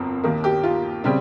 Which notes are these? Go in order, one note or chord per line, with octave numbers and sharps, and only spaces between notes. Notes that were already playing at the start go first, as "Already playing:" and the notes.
Already playing: G1 F2 C4 A#4
D#2 D#3 A#3
G4
F4
C#3 G3 C4